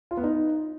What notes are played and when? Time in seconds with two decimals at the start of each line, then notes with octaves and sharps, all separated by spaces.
0.11 F4
0.17 B3
0.24 D#4